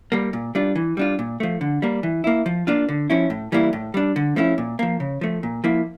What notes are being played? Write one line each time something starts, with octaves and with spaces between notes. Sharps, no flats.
G3 A#3
A#2
G3 D4 F4
E3
G3 D4 F4
A#2
F3 A3
D3
G3 A#3
E3
A#3 E4
F3
A#3 D4 F4
D3
F3 C#4 E4
A2
E3 G3 A#3 E4
A2
G3 D4
D3
F3 A3 C#4 E4
A#2
F3 A#3
C#3
F3 A3
A#2
F3 A#3 E4